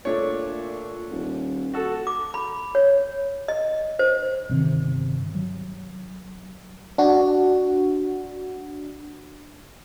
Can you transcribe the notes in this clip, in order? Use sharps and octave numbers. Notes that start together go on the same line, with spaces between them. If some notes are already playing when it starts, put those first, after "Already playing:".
A#2 A3 D4 C#5
D#1
F#4 A4
D6
B5
C#5
D#5
C5
G1 C3 D#3
F#3
D4 F#4